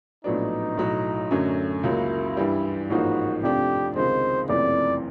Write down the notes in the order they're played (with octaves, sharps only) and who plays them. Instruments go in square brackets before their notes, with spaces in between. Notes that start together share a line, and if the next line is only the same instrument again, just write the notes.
[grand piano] A#1 A2 F#3 B3 D4 [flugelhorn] D#4
[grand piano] B1 A2 F#3
F#2 D3 F#3 A3 C#4
[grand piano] C#2 C#3 F#3 A#3 [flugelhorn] E4
[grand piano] G2 E3 G3
[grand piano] A1 G#2 F3 A#3 D#4 [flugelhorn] F#4
[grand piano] F2 C3 F3 A3 D4 [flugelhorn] G4
[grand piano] C#2 C3 D#3 G#3 [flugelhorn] C5
[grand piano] F#1 F2 C3 E3 A3 [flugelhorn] D5